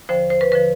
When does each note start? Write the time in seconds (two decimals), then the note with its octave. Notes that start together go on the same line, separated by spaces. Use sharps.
0.09 D#2 D3 F3 C5
0.30 C5
0.41 B4
0.52 D3 F3 B4